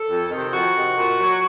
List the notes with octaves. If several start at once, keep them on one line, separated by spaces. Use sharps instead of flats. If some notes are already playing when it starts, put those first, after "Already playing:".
Already playing: A4
F2
C3 D#3
F2 F#4
C3 D#3
A#2
F#3